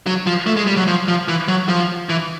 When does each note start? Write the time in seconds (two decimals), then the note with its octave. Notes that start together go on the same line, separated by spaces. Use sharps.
0.07 F#3
0.27 F3
0.47 A3
0.57 G#3
0.67 G3
0.77 F#3
0.88 F3
1.08 F3
1.28 E3
1.48 F#3
1.69 F3
2.09 E3